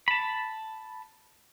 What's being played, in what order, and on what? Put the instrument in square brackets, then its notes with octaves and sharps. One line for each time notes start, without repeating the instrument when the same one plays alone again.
[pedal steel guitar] A5 B5